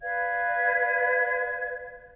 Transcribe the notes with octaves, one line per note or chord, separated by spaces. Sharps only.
B4 D5 F5 G#6